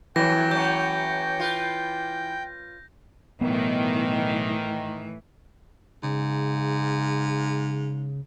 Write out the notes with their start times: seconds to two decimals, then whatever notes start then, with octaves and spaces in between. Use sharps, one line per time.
0.16 F2 A2 E3 F#3 G5 A#6
0.51 F#3 A3 C#4 G6
1.40 F4 B4
3.41 B1 A2 D#3 E3 B3
6.03 G#2 C#3